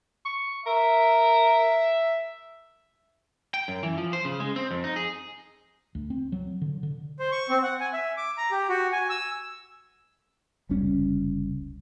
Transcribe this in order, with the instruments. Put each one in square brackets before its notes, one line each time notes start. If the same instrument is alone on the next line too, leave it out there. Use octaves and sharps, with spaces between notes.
[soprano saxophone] C#6
[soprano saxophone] A#4 [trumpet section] E5
[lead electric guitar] G5
F#2
E3
F3
C5
C#3
G#3
C4
F2
D#4
G#4
[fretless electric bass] D2
C4
F#3
D3
D3
[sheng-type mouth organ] C5
C#6
C4
F#5
G#5
E5
D6
A#5
G4
F#4
G#5
E6
[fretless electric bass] F1 C#2 G3 C#4